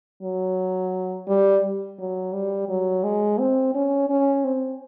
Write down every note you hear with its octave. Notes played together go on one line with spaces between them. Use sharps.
F#3
G3
F#3
G3
F#3
G#3
C4
C#4
C#4
C4